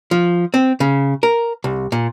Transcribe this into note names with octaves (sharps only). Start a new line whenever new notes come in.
F3
C4
C#3
A#4
C2
A#2